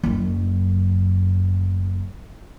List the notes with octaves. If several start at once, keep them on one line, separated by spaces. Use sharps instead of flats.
F#1 F#2